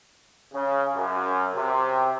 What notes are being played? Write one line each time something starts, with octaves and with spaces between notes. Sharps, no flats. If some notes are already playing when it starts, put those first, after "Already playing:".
C#3
F#2
C3